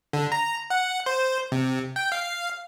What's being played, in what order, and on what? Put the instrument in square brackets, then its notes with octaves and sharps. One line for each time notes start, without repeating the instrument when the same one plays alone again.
[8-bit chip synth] D3
A#5
F#5
C5
C3
G5
F5